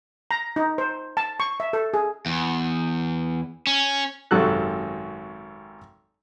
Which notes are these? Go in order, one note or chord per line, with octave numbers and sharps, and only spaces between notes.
A#5
D#4
C5
A5
C#6
E5
A4
G#4
E2
C#4
G#1 F#2 C3 F#4 A4 F#6